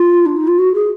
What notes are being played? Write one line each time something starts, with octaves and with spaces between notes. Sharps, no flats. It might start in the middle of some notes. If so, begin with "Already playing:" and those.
Already playing: F4
D4
D#4
F4
F#4
G#4